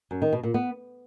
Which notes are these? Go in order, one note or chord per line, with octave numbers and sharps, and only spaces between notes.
F#2
D#3
B2
A#2
B3